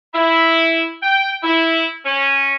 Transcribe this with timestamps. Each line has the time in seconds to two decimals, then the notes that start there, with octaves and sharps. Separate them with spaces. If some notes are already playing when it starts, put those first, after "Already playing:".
0.14 E4
1.02 G5
1.43 E4
2.04 C#4